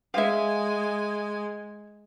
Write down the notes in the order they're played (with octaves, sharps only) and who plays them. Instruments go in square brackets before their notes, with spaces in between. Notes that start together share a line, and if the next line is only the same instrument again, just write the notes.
[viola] G#3 G#5 [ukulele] E5 F5